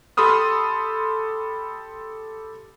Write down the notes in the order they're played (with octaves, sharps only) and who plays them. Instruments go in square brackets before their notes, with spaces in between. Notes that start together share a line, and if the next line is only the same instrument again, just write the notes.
[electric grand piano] G4 A4 B5 C6 D#6 F6